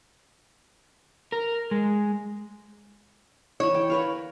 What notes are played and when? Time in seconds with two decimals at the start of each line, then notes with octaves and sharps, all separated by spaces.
1.32 A#4
1.71 G#3
3.60 E3 E4 C#5
3.74 G5
3.90 A#4 B4 F5